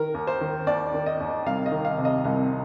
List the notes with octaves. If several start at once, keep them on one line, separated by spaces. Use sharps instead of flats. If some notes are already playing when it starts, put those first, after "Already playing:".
Already playing: D#3 A#4
D#2
C5
D#3
D#2 D5
D#3
D#5
D#2
C2 F5
D#5
D#3
F5
C3
D#5
C2 F5